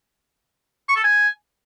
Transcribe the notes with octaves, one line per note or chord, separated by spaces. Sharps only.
C#6
A4
G#5